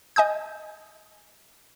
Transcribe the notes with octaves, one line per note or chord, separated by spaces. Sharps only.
D#5 G#5 D#6 G6